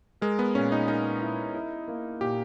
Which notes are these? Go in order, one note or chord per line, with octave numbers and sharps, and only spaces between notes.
G#3 A#4
B3
A#2 C#4
D#4
D#4 A#4
E4
E4
A#3
A#2 G4